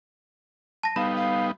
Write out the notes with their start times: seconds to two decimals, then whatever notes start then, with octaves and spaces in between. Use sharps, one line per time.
0.83 A5 A#6
0.96 G3 B3 D#4 F5 B5
1.16 F5